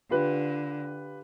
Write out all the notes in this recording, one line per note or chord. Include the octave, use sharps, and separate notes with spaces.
D3 F4 G4 B4